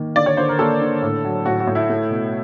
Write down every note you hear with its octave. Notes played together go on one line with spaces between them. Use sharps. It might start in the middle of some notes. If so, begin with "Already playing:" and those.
Already playing: D#3 A#3
D3 D5
C#5
D3 C5
A#4
A#3 A4
D3
A2
F#3
A2 F#4
F#4
A2
E4
A3
B2